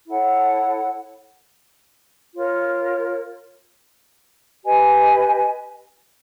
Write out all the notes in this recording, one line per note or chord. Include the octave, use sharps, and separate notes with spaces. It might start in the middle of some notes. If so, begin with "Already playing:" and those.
E4 A4 C#5 F#5
F4 A#4 C#5
G4 B4 D#5 G#5